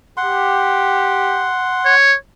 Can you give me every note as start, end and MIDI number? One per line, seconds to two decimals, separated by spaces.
0.17 1.51 67
0.17 1.94 78
0.17 1.94 84
1.85 2.15 73